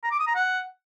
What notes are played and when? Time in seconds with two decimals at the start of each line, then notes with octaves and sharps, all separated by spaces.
0.03 A#5
0.11 D6
0.19 D#6
0.27 A#5
0.35 F#5